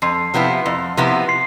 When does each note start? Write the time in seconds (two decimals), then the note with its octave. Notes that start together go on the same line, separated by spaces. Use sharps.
0.02 F2 C6 C7
0.34 C3 F3 B3 E4
0.66 F2
0.97 C3 F3 B3 E4
1.28 C6 C7